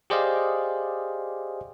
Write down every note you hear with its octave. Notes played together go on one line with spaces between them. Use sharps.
G4 G#4 C5 D5 D#5 F5